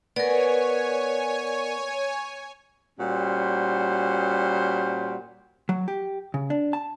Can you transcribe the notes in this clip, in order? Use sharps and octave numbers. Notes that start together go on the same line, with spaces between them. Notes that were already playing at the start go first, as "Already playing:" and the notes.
B3 A#4 C#5 D5 G#5
A#2 G3 C#4 F#4 C5
F#3
G4
C#3
D4
A5